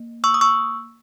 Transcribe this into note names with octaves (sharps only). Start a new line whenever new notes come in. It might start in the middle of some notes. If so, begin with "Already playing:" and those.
Already playing: A#3
C#6 E6
D#6
C#6 E6